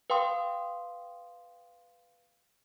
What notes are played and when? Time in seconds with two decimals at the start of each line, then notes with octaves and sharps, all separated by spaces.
0.10 B4 F5 G5 C6 D#6